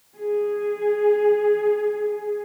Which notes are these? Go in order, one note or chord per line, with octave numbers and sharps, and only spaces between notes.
G#4